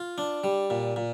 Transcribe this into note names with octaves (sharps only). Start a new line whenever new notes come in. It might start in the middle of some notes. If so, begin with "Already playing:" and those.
Already playing: F4
D4
G3
A#2
A#2